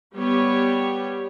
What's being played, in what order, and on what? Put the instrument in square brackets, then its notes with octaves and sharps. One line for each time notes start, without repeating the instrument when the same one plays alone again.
[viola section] G3 B3 G4 C#5